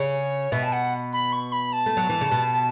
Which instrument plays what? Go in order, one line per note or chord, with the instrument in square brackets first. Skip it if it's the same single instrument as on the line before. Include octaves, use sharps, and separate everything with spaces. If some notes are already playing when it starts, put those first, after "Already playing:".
Already playing: [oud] C#3 [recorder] C#5
[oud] B2 [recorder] E5
[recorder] A5
F#5
B5
C#6
B5
A5
[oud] A3
F#3
E3
C#3
B2